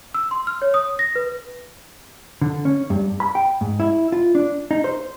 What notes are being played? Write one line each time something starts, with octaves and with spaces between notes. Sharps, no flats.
E6
C6
F6
C#5
D#6
A#6
B4
D3
C#4
G2
B5
G5
G#2
E4
F4
D4
D#4
C5